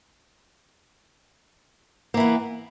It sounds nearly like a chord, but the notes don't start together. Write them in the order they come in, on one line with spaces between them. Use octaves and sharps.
A#3 E3 B3